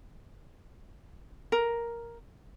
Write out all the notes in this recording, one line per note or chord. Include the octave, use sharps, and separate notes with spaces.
A#4